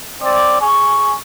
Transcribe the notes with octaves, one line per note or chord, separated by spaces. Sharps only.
C4 D5
G#4 G#5 C#6